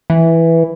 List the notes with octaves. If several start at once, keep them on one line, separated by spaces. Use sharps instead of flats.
E3